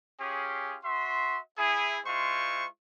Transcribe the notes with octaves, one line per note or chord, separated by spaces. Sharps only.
C#4 F4 G4 G#4
F#4 E5 C6
E4 G#4
G#3 E4 F4 C5 C#6